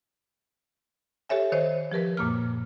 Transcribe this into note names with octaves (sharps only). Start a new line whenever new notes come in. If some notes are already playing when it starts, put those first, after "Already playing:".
G4 A4 C#5 E5 G#5
D#3 C5 C#5 D#5
F3 G4 A#4 B4
F#2 A#2 A#3 F6